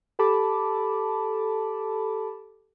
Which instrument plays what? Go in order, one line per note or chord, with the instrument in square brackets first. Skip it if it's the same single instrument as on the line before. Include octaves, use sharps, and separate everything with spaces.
[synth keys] G4 A4 A5 B5 D6